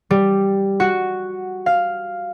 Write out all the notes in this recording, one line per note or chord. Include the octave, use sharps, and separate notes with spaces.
G3
F#4
F5